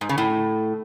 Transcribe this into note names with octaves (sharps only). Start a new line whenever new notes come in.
G#2
C#3
A2